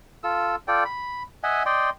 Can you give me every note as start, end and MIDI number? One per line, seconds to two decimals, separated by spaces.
0.24 0.56 65
0.24 0.56 69
0.24 0.56 88
0.68 0.84 65
0.68 0.84 69
0.68 0.84 74
0.68 0.84 79
0.85 1.23 83
1.43 1.63 75
1.43 1.63 76
1.43 1.63 78
1.43 1.63 80
1.66 1.90 74
1.66 1.90 75
1.66 1.90 79
1.66 1.90 84